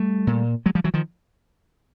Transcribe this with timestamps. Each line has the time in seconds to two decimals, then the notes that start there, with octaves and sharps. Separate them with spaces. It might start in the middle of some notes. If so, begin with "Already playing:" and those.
Already playing: G3 A3
0.27 A#2
0.66 F#3 G#3
0.75 F3 G3
0.84 E3 F#3
0.94 D#3 F3